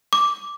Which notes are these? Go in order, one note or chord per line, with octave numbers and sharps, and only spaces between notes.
D6